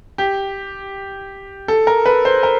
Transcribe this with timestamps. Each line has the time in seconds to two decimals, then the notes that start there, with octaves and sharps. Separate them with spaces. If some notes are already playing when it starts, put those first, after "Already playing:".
0.18 G4
1.68 A4
1.87 A#4
2.06 B4
2.25 C5
2.43 A#4